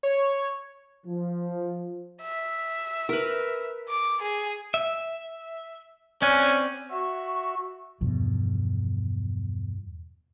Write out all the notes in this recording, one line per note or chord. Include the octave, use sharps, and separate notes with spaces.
C#5
F3
E5
A#4 B4
D6
G#4
E5
C4 C#4 D5 F#6
F#4 E5 C#6
E2 G2 B2 F3